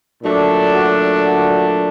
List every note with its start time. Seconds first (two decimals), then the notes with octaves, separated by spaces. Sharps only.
0.23 A#2 F#3 A3 D4
0.73 F#4
1.24 F#4